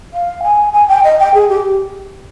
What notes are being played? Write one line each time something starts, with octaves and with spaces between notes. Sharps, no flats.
F5
G#5
G#5
G5
D#5
G5
G#4
G4